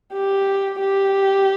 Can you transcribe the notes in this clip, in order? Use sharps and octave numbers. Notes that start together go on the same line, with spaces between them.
G4
G4